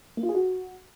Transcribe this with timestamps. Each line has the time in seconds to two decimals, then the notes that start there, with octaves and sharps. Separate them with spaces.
0.17 A#3
0.23 F4
0.29 G#4
0.35 F#4